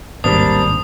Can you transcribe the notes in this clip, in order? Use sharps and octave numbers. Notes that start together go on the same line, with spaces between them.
A1 D#2 G#2 G3 A#3 C4 D4 D#6